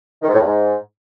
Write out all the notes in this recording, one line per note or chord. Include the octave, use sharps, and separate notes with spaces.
D#3
G#2
A2
E2
G#2